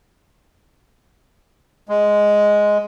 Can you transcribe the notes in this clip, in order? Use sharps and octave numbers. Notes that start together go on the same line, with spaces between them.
G#3